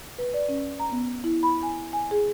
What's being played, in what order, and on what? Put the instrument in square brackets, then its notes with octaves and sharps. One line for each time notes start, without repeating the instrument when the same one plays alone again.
[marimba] B4
D5
C#4
A#5
B3
E4
B5
G#5
G#5
G#4